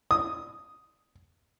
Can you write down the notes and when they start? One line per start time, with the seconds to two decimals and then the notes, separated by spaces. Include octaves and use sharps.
0.11 D#6